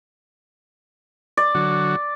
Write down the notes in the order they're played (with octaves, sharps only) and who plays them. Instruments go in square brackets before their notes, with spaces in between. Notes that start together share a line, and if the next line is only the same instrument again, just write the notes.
[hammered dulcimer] D5
[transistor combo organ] D3 F#3 F#4